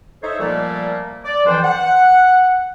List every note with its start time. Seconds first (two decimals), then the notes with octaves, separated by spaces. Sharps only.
0.23 D#4 A4 C5 C#5 E5
0.39 A#2 F3 G3 A3 A#3
1.24 D5
1.46 F2 E3 F3 D4 C5 G5
1.64 F#5